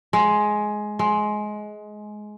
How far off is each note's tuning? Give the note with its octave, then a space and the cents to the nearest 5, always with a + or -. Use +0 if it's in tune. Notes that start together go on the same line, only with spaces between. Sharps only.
G#3 +15
G#3 +20